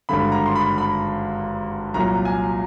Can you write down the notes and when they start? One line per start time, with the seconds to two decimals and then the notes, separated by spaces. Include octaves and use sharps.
0.09 G#1 G2 D3 B5
0.32 A#5
0.46 C6
0.55 B5
0.78 B5
1.94 C2 A#2 F#3 A#5
2.25 G#5